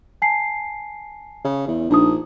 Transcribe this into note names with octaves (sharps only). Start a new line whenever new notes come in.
G#5 A5 C7
C#3
E2
A#1 D4 D#4 D#6